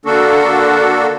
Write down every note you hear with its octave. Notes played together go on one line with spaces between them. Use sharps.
D3 A#3 D4 F#4 A4